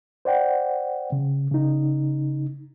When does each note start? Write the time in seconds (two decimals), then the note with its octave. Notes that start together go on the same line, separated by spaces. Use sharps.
0.25 C5 D5 F#5 G5
1.12 C#3
1.52 C#3 D#4